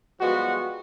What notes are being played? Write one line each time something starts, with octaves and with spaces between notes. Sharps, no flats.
F3 G3 G#3 B3 F#4